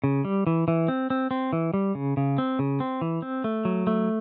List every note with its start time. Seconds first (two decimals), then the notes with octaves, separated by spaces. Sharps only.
0.04 C#3
0.25 G3
0.47 E3
0.68 E3
0.88 C4
1.10 C4
1.31 C4
1.53 E3
1.74 G3
1.95 C#3
2.17 C#3
2.38 C4
2.59 C#3
2.80 C4
3.01 E3
3.22 C4
3.44 A3
3.65 F#3
3.87 A3